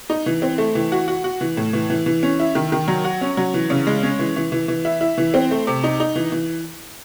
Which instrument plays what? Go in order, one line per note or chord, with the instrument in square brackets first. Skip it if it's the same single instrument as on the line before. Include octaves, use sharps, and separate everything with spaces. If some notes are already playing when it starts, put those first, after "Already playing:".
[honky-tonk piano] D#4
E3
C4
A3
E3
F#4
F#4
F#4
E3
A2
E3
E3
E3
C#4
E4
D#3
D#3
F#3
F#4
C#4
F#3
E3
C#3
G#3
C#4
E3
E3
E3
E3
E4
E4
E3
C4
A3
C3
D#4
D#4
E3
E3